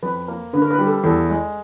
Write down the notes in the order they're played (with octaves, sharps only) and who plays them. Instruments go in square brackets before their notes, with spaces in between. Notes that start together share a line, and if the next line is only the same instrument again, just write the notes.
[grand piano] F2 [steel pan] B4
[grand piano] A#3
[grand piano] D3 [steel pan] B4
[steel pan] A#4
B4
[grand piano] G3
[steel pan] A4
[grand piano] E2 [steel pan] A4
[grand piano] G#3